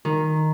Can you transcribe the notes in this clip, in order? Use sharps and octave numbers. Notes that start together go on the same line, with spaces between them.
D#3